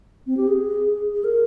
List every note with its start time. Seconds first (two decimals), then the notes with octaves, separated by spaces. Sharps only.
0.27 C4
0.37 G4
0.48 G#4
1.14 G#4
1.24 A#4